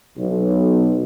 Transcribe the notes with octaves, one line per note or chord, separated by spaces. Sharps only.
B1